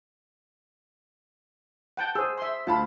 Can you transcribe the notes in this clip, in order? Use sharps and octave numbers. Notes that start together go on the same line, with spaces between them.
F#5 G5 A5
G#4 C5 E6
E5 C6
D2 F4 A5 B5